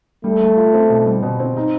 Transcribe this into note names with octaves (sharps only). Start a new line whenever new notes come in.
G3 A3
G3
F4
C4
B2
G3
B2
C4
D#4